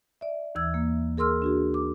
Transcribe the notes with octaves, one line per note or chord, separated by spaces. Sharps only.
D5 E5
D#2 E3 E6 G#6
A#3
G#4 A#4 C6 E6 F6
D4 F#4 G#4
D6